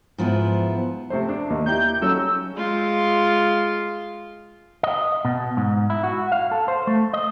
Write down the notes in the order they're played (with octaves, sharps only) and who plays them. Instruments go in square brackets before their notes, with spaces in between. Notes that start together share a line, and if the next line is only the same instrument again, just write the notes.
[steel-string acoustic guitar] G#2 F3 B3 E4
[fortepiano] C3 A3 C5
D4
[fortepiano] D#2 [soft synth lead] A#3
[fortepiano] D#4 E4 G4 [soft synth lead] G6
[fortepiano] F#3 C#4 A4 [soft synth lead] E6
[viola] G#3 F4
[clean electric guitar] D#5
B2
G#2
E4
F#4
F5
A4
C5
A3
D#5